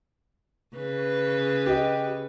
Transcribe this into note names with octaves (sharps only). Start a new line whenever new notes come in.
C#3 B4
G4 D#5